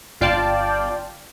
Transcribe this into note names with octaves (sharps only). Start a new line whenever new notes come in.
G1 F4 D5 F5 G5 A5